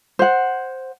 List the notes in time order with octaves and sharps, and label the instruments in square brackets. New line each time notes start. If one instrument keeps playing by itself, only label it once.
[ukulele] C5 F#5